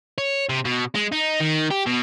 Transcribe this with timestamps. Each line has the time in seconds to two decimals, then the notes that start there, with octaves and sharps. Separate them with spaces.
0.18 C#5
0.49 C3
0.65 B2
0.95 G#3
1.12 D#4
1.40 D#3
1.71 G4
1.86 B2